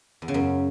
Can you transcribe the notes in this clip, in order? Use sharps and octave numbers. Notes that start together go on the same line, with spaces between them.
E2
C#3
F#2